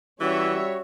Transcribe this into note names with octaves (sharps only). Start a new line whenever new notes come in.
E3 G3 C#4 F#4 C#5 E5